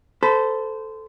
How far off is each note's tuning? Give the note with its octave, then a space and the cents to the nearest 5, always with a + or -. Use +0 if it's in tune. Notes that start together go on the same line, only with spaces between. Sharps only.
A4 +0 C5 -20 B5 +0